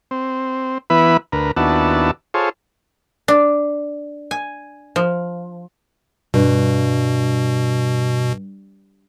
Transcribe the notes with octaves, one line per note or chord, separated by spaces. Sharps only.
C4
E3 B3 E4 B4 B5
D2 A#4 B4
D#2 B3 D4 E4 F#4 A5
F4 G#4 A4 C5 C#5
D4
G#5
F3
G2 B2